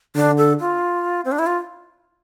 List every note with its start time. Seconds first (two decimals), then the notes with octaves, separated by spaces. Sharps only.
0.16 D3 D4
0.38 A4
0.60 F4
1.25 C4
1.32 D4
1.39 E4
1.46 F4